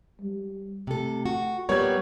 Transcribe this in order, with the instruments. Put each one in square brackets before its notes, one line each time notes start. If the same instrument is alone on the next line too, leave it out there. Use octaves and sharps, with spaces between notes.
[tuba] G3
[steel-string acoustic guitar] C3 A4 [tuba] A3
[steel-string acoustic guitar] F#4
[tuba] A#2 [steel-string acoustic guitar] G3 B3 A#4 [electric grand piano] C#5 G#6